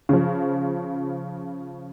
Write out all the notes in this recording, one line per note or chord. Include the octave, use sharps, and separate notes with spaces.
C#3 F3